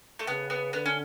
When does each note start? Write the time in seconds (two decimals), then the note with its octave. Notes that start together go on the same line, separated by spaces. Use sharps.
0.19 A3
0.27 C#3 B3
0.50 B3
0.73 D3 B3
0.86 C#4